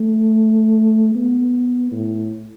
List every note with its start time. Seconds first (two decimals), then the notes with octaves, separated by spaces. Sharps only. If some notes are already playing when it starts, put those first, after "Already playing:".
Already playing: A3
1.15 B3
1.92 A2